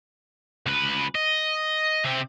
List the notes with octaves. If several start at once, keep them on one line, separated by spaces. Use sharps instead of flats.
C#2 B4
D#5
C3 C4